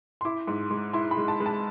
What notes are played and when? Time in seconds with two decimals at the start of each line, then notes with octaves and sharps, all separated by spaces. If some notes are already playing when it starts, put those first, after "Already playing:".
0.21 C6
0.25 E4 D6
0.47 G#2
0.70 G#3
0.93 E4 C6
1.11 B5
1.17 G#3
1.28 A5
1.40 G#3
1.46 A5